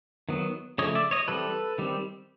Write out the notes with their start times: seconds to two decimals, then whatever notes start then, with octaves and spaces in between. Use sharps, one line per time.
0.29 D#3 F#3 B3
0.78 C#3 F3 A3 C#5 D#5
0.95 D5 E5
1.11 C#5 D#5
1.28 E3 G3 C4 A4 B4
1.78 D#3 G3 C4